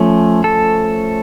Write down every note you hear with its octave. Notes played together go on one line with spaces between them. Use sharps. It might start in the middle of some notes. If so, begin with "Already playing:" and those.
Already playing: F3 A3 C#4
A4